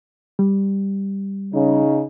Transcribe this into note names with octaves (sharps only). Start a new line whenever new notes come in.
G3
C#3 D#4